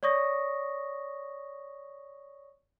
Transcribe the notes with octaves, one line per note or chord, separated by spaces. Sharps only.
C#5 D5 C#6 D#6 A#6